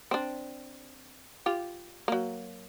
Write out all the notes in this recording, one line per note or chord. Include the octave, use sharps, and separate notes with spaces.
C4 D4
F4 G4
F#3 A#3